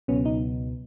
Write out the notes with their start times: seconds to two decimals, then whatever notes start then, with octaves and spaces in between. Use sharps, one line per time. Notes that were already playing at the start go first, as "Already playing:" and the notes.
0.08 C#2 B2 F#3 B3 C#4
0.25 D#4